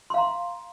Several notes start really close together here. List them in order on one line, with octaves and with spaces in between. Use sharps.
C6 F5 A#5